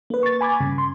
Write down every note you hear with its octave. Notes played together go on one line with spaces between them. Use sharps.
A#3 B4
C#6 A6
G#5 B5 D6 G#6
G2 C#3
C6